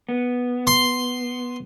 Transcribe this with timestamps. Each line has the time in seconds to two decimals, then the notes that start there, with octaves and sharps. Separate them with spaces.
0.09 B3
0.67 C6